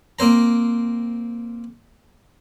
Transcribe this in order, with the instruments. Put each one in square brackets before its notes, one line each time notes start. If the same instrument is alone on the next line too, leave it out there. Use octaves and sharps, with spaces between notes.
[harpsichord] A#3 C4 C5 A#5